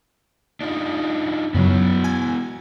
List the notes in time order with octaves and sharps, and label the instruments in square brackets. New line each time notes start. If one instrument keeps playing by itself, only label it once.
[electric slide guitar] D4 D#4 F4
[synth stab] F#2 C#3 F#3 [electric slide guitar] B3 E4 F#4
[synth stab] G#5